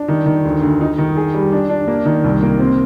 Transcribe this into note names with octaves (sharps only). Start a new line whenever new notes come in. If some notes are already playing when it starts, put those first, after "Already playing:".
Already playing: D4
D#3
D#3
D2
D2
D#4
D#3
G#4
G3
D4
D4
A#3
D#3
C2
A#3
C4